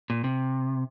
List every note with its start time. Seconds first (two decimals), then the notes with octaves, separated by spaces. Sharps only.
0.10 A#2
0.24 C3